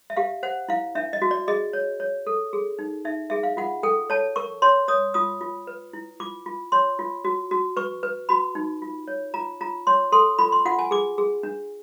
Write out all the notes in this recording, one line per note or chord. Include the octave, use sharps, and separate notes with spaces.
E5
G4 F5
C5 F#5
E4 F5
D4 E5
D#5
F#4
D5
G#4 D#5
C#5
C#5
A4
G#4
D#4
D#4 E5
G#4 E5
F5
F4 F#5
A4 G5
C#5 A5
A#4 C#6
C#5 C6
C#5 D#6
F4 D#6
F4
B4
E4
F4 D6
F4
C#5 C6
F4
F#4
F#4
B4 C#6
B4
F#4 B5
D#4
F4
C#5
F4 A#5
F4 A#5
C#5 C6
A4 C6
F4 B5
C6
F4 F#5
G#5
G#4 D6
G#4
D4